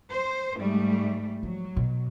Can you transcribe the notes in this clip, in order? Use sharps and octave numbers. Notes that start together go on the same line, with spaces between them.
C5
G#2 G3 A3
F3 F#3
B2